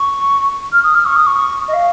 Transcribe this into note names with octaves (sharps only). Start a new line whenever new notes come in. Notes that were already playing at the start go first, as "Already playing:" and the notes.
Already playing: C#6
F6
D#6
F6
C#6
D#6
C#6
D#5
F5